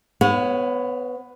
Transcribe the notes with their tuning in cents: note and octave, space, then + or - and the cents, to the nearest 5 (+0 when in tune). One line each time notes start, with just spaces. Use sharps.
B3 +15 C#5 +0 F#5 -40